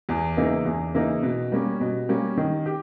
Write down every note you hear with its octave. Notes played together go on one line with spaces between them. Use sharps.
E2
C#3 E3 A#3 D#4
E2
C#3 E3 A#3 D#4
B2
G3 A#3 C#4
B2
G3 A#3 C#4
D#3
G4